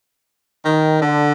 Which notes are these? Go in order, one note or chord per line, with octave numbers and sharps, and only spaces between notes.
D#3
D3